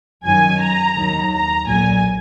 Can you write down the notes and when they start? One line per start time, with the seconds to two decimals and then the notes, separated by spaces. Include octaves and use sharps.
0.25 F#2 D#3 F#3 G#5
0.61 A#5
0.96 D#2 D#3 F#3
1.32 A#5
1.66 B1 A#2 F#3 G#5